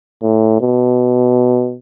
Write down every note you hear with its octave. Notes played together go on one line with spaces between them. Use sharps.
A2
B2